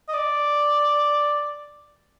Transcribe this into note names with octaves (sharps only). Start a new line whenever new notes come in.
D#5
D5